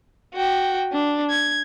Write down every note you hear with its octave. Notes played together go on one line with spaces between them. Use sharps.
F#4 G5
D4
G#6